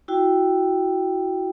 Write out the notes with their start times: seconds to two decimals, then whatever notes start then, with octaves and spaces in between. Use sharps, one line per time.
0.08 E4 F#4 G5